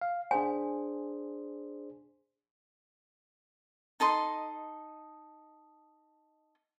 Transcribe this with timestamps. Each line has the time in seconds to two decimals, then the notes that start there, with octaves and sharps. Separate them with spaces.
0.01 F5
0.31 D4 G#4 C5 G#5
4.00 D#4 A4 D#5 C6